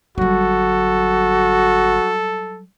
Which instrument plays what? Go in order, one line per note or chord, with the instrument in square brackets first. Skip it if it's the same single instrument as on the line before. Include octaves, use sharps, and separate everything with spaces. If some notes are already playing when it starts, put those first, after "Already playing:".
[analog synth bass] G1 [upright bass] F#3 G3 [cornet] F#4 [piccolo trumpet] A4